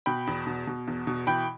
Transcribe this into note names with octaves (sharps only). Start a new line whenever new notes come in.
B2 G5 B5
E2
B2
B2
E2
B2
E3 G5 B5